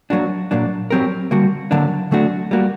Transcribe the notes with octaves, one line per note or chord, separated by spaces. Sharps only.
F#3 A#3 D4 F#4
A#2 F#3 A#3 D4
F#3 C4 G4 A#4
D3 G3 A#3 F#4
D3 F#3 A#3 D4
D3 F#3 A3 D4 F#4
G3 A#3 F#4